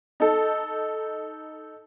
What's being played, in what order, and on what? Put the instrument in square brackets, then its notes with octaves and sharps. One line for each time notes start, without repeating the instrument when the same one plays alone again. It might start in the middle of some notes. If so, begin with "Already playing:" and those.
[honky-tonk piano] D#4 A4